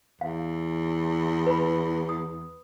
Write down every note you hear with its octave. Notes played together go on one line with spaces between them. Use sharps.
E2 F5
B4 B5
D#6